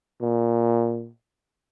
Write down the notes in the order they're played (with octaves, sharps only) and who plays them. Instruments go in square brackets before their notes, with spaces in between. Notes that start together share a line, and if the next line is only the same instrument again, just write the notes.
[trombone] A#2